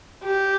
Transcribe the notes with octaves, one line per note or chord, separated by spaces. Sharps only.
G4